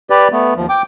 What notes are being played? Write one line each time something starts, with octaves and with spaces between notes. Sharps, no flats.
G4 B4 D5
A3 B3
D#2 F3
G5 D6